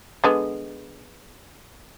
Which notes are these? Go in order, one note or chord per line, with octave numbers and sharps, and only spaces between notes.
D3 G#3 B3